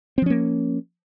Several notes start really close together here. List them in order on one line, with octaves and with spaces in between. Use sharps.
C4 F3 C#4 A#3